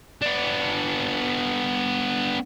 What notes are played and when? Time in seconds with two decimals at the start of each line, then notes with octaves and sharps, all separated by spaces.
0.22 B3 D4